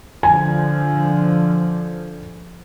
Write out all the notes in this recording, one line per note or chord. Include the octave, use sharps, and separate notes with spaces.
D3 F3 G#5